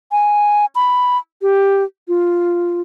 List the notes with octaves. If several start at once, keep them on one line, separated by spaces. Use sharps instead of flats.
G#5
B5
G4
F4